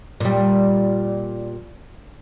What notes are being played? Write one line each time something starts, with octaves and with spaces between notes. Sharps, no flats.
A#2 G3